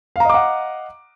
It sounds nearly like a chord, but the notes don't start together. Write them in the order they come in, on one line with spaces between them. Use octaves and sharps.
F5 A#5 D#5 D6 F#5